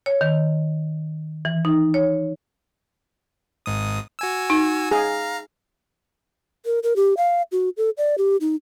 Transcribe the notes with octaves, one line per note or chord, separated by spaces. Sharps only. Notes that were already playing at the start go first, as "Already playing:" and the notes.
C#5
D#3
E3
D#4
C#5
G#1 G#2 D#6
F#4 G#5 E6
D#4
G#4 F5 A#5
A#4
A#4
G4
F5
F#4
A4
D5
G4
D#4